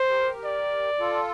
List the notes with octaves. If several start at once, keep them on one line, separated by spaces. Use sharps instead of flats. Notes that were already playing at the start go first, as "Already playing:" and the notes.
Already playing: C5
G4 A#4
D5
F4 A4